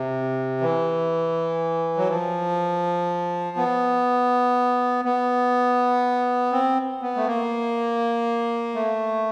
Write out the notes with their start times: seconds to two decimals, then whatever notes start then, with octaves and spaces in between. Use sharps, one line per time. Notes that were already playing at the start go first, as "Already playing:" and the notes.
Already playing: C3
0.61 E3
1.97 F#3
2.09 F3
3.57 B3
5.05 B3
6.52 C4
7.02 B3
7.16 A3
7.27 A#3
8.75 A3